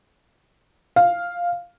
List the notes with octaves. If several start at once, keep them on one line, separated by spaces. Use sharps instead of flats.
F5